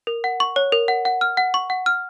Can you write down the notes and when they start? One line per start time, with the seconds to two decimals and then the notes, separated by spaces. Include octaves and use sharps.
0.07 A#4
0.24 F#5
0.40 C#6
0.56 C#5
0.72 A#4
0.88 F#5
1.05 F#5
1.21 F6
1.37 F#5
1.54 C#6
1.70 F#5
1.86 F6